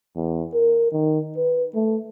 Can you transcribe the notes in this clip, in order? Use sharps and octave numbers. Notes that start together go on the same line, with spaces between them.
E2
A#4
D#3
B4
A3